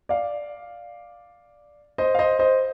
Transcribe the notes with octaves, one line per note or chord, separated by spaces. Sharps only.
D5 F5
C5 D#5
F5
C5 D#5
C5 D#5